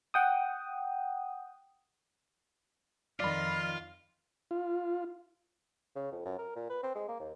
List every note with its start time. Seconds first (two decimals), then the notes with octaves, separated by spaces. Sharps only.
0.14 F#5 G5 D#6
3.20 F2 D#3 F4 D5 B5 F6
4.51 F4
5.95 C#3
6.12 F2
6.25 F#2
6.38 A#4
6.56 A#2
6.69 B4
6.83 C4
6.95 G#3
7.08 A#3
7.20 D#2